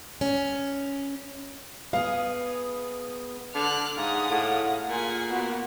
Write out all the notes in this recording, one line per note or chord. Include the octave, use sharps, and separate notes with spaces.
C#4
B3 G#4 F5
D3 D6 F6 F#6
G#2 G#4 F5 F#5 D#6
A2
A#2 F4 G#4 F#5 G#5
A#3 B3 F#4